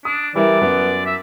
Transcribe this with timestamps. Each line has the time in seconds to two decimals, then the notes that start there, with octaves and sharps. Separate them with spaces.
0.05 D4 D#6
0.36 E3 G3 E4 A#4 D5
0.61 F#2 B3
1.06 E5